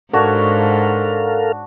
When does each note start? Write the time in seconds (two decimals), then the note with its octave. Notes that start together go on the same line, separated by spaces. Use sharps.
0.13 G#2 D4 F#4 A4 A#4 C#5 F5